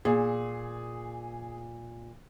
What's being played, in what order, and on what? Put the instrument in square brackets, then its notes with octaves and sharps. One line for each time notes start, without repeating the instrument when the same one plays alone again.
[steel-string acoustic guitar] A#2 [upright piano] G#4